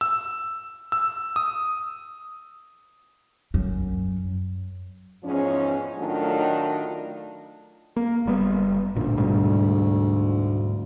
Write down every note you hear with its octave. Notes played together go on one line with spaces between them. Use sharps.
E6
E6
D#6
F#2
E2 G#2 F3 C#4
A2 D#3 F#3 A3 D4 F4
A#3
F#1 G3 B3
A1 D2 A#2
G#2 B2 G3